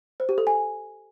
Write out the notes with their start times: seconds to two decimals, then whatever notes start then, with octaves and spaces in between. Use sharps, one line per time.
0.20 C5
0.29 G4
0.38 A4
0.47 G#5